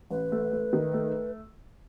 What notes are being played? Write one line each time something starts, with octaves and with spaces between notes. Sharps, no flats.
A1 B4
A3
A3
D#3
A3